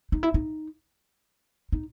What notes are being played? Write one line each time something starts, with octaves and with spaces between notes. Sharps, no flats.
D#4
E4
D#4
D#4